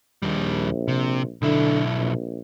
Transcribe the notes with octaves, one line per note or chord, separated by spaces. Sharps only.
A#1 D#2 G3
C3
B1 D3 E4
A#1